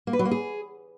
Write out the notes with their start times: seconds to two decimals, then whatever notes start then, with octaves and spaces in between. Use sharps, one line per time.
0.07 A#3
0.13 B4
0.19 F#3
0.25 A#3
0.31 G#4